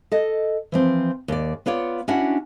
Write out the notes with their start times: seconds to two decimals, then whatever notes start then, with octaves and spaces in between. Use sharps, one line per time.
0.12 A4 D#5
0.72 E3 F3 C4
1.28 D#2 D5
1.66 B3 F4 C#5 D5
2.08 C#4 D4 E4 F#4 F#5